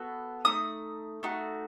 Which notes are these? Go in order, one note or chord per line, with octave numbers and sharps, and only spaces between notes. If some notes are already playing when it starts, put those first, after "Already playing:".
Already playing: B3 F#4 A4
A3 D#4 D#6
A3 D#4 F#4